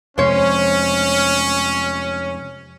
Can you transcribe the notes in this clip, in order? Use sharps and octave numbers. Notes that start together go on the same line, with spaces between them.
F2 C3 G#3 C#4 C5 C#5